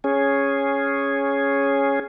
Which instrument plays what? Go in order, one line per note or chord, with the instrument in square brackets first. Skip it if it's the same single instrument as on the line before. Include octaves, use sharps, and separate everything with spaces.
[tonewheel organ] C#4 G#4